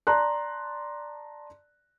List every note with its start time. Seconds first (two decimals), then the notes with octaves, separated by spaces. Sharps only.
0.07 D5 A5 A#5 C6 F#6